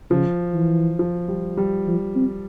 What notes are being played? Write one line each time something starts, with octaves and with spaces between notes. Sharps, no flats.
C#3 F3
E3
F3
G3
G3
F3
C4